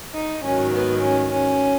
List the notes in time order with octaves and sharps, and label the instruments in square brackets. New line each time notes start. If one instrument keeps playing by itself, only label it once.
[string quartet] D#4
G#2 D#3 F#3 C#4
B3
C#4
C#4